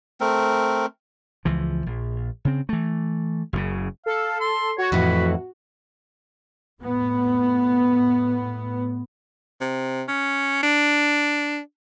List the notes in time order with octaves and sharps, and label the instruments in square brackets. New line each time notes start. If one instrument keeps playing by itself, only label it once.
[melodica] A3 C4 A#4
[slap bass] C#2 E3 F3
A#1
C#3 C4
E3 A3
F#1 F#2 A2 C#3
[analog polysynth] A4 [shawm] F5
[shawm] C6
[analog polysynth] F#4 [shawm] C#5
[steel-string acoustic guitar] F2 A2 E3 [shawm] B4
[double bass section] A2 B3
[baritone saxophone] C3
C#4
D4